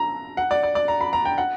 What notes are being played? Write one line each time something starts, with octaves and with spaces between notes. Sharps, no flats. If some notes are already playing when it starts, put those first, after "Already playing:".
Already playing: A#5
F#5
D5
D5
D5
A#5
B5
A#5
G5
F#5